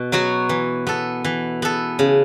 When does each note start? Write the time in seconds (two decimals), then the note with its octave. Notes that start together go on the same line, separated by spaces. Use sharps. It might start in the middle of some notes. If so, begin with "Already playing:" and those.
Already playing: B2
0.12 F#3 B3 F#4 C#5
0.49 E3
0.87 B3 A4
1.24 E3
1.62 B3 A4
1.99 C#3